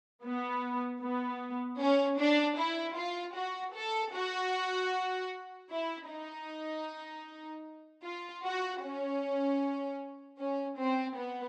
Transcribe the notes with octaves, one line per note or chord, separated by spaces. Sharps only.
B3
B3
C#4
D4
E4
F4
F#4
A4
F#4
E4
D#4
F4
F#4
C#4
C#4
C4
B3